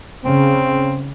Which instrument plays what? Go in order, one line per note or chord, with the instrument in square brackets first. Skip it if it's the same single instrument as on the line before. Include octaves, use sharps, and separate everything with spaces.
[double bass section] C#3 [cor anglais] C4